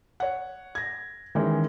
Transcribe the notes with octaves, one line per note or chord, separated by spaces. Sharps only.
C#5 F#5
G#6 A#6
D#3 E3 G#3 C#4